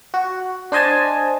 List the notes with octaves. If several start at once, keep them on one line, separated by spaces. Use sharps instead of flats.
F#4
D4 C5 D#5 G#5 A5